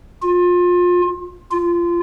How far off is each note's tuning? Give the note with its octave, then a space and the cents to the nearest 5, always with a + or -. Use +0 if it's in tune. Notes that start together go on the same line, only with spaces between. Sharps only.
F4 +25
F4 -20